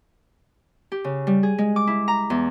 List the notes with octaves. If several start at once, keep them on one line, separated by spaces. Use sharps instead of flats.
G4
C#3
G3
G#4
G#3
D6
E4
A#5
E2